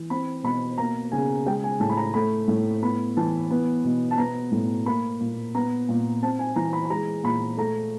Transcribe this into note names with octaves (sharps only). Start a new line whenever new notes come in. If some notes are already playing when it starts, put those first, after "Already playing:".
Already playing: E3
C4 B5
B2 B5
A#3 A#5
C#3 G#5
G#3 G5
G#5
A2 A5
B5
A#5
A3 B5
A2
B3 B5
E3 A5
B3
B2
A5
B3 A#5
A2
A#3 B5
A#2
B3 A#5
A#2
C4 A5
G#5
E3 A#5
B5
B5
G#3 A#5
A#2 B5
A3 A#5